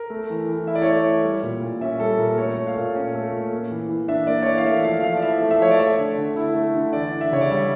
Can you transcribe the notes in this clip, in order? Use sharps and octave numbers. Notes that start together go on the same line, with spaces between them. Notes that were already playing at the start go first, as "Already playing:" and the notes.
Already playing: A#4
A3
E3
E3
E4 E5
D5
C#5
A3 D5
E3
G3
A#2
A#2
C#4 E5
G3 A4
A#2 A#4
A3 C#5
A#2
F5
A#2
C#4
A3
A#2
A#3
E3
E3
D4 E5
A#3 D5
C#5
E3 D5
F5
A3 E5
F3 F5
F3 F5
D5
E4 E5
A3
E5
F3 C#5
D5
A3 E5
D3
D3
E4
A3
D3
E3 D5
D4
E5
C#3 C#5
D5
G3 E5